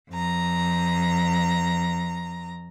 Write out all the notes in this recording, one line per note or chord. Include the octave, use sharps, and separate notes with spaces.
F2 A#5